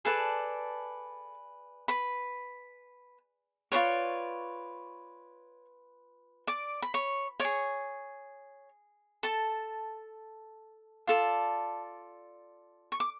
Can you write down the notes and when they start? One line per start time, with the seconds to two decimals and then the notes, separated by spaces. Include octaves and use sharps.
0.05 G#4 A4 B4 D5 A5
1.88 B4 B5
3.72 F4 G#4 B4 C#5 D5 C#6
6.47 D5 D6
6.82 B5
6.94 C#5 C#6
7.40 G#4 C#5 D5 C#6
9.23 A4 A5
11.07 F4 A4 D5
12.92 C#6
13.00 D6